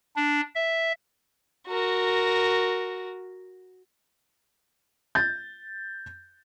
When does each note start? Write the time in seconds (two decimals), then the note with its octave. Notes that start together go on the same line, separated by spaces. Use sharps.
0.16 D4
0.55 E5
1.68 F#4 A#4
5.15 G6 A6